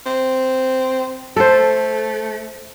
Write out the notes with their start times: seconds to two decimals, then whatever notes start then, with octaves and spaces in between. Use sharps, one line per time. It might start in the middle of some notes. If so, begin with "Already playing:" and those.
0.06 C4
1.36 A3 A4 C5